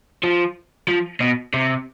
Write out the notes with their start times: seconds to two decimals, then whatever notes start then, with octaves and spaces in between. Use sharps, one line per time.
0.23 F3
0.88 F3
1.21 B2
1.54 C3